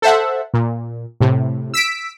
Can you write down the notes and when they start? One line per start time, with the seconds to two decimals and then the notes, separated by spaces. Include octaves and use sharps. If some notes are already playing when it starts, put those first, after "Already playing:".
0.02 A4 C5 E5 F#5
0.54 A#2
1.20 A2 C3
1.74 E6 B6 D7